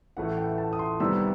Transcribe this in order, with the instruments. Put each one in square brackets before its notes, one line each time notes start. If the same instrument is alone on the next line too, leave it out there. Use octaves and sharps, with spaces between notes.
[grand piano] A1 A2 E3 A3 F#5
G5
A5
D#6
C6
C2 C3 D#3 G3 B3 E6